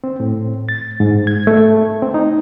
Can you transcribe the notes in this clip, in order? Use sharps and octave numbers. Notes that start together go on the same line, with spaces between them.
C4
A2
A6
G#2
G#6
A3
C4
D#4